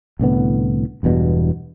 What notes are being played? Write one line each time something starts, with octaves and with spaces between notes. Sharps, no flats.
C2 A2 D3 B3
E1 E2 G2 B2